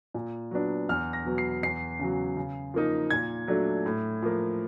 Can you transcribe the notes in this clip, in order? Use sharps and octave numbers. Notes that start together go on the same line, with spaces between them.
A#2
F#3 B3 D4
E2 F6
A#6
B2 F#3 B3
C7
E2 C7
C#3 F#3
C#3
F3 A#3 D#4
A#2 G#6
F#3 A3 D4
A2
F3 A#3